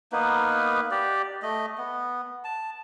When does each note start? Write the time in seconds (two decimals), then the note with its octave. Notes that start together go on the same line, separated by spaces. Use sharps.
0.12 A#3 B3 D#4 B4
0.91 G4 D5
1.43 A3 D#5
1.78 B3
2.44 A5